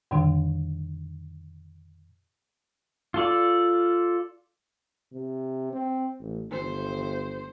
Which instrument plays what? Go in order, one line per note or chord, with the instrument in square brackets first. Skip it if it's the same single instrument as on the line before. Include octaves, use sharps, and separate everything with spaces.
[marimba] F2 A#2 D3 D#3 G3 D4
[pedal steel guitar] F4 A4 D5
[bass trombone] C3
C4
A1
[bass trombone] G1 [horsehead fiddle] C5